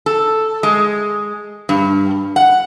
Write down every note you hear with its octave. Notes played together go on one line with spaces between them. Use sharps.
A4
G#3
G2
F#5